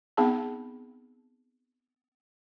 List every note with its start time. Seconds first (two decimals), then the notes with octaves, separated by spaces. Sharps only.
0.17 B3 C4 D#4 G#4 F5 A5